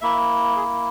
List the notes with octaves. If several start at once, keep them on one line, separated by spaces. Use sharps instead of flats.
A#3 E4 E5
G#4